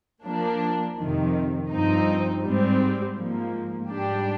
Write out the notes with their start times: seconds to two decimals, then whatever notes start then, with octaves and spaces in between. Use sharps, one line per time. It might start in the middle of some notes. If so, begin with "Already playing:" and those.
0.25 F3 A#3 D4
0.98 F2 C3 D#3
1.71 G2 F3 C4 D#4
2.45 G#2 G3 C4
3.18 G#2 F3 A#3
3.91 G#2 G3 D4 G4